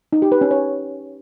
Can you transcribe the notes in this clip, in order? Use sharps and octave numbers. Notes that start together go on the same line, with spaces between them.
D#4
G4
B4
C#4
C#5